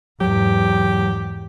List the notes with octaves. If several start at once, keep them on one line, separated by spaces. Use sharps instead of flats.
E2 G#2 F#3 G4